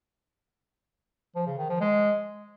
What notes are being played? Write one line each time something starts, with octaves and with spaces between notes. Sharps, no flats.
F3
C#3
D#3
F3
G#3